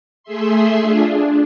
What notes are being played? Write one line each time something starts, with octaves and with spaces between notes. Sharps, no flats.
A3 G#4 E5 C6
D4 F4 G#4
D4